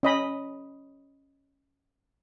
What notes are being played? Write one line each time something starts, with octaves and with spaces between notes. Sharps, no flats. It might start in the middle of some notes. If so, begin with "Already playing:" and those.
C#4 D#5 B5